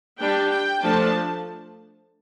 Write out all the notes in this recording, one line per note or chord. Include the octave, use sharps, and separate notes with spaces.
G3 D4 G5
G5
F3 A3 D4 A5